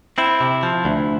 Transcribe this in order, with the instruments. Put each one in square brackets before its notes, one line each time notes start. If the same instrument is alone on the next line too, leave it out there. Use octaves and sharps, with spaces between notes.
[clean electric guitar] C4 E4
C3
F3
D2